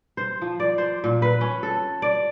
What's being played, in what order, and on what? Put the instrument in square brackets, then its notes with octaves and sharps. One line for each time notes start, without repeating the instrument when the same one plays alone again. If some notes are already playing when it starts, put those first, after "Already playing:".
[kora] C5
F3
D5
C5
A#2
B4
C#4
A4
D5